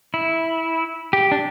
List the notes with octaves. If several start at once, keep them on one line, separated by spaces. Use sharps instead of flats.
E4
G4
D4